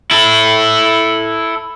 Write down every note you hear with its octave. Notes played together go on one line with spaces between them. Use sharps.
E4 A4